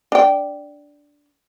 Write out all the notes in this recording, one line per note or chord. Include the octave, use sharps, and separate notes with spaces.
D4 G5